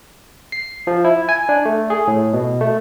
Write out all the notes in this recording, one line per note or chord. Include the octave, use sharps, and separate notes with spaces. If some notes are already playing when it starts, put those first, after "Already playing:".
C7
F3
E4
G#5
D4
A3
G#4
A2
B2
A3